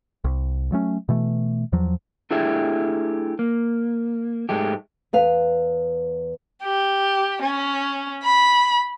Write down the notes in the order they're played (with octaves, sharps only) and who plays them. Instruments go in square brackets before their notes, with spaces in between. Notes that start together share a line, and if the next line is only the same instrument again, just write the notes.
[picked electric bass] C2
F#3 A3 C#4
B2 E3 A3
E2 F3 F#3
[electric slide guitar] A3 D4 E4 G4 G#4 E5
A#3
G#2 G#3 A3 G4
[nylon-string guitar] E2 B4 F5
[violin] G4
C#4
B5